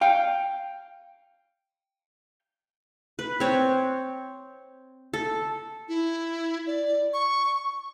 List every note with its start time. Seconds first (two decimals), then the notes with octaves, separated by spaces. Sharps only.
0.01 F5 G5
3.19 B4
3.40 C4 C#5
5.13 A4
5.88 E4
6.67 D5
7.14 C#6